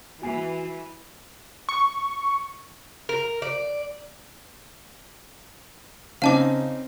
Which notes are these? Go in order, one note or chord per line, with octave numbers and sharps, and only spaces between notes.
E3 F#4 G#5 C7
C#6
A#4
D5
C#3 C4 C#4 D#4 F5 A5 D6